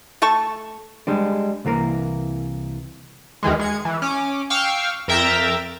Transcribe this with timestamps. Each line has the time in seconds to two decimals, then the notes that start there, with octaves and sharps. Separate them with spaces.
0.22 A3 A4 A5 C#6
1.07 G3 G#3 D4
1.65 C2 E3 A#3 A#4
3.43 D#2 D#3 E3 G#3
3.60 G#3 G#6 C#7
3.85 E3
4.02 C#4 D6
4.50 F5 G5 C#6 D6 E6 F6
5.08 F2 A#4 E5 G5 A#5 A6